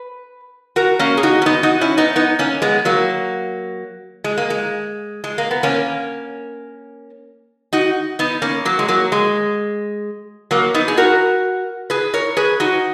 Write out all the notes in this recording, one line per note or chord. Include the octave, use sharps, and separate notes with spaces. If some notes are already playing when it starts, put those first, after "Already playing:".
Already playing: B4
F#4 A#4
A#3 C#4
G#4
D#4 F#4
C#4
B3 D#4
D#4 F#4
C#4 E4
B3 D#4
B3 D#4
A#3 C#4
G#3 B3
F#3 A#3
G#3
A#3
G#3
G#3
A#3
B3
A#3 C#4
D#4 F#4
B3 D#4
A#3 C#4
F#3 A#3
G#3
F#3 A#3
G#3
F#3 A#3
B3 D#4
G#4
F#4 A#4
G#4 B4
A#4 C#5
G#4 B4
D#4 F#4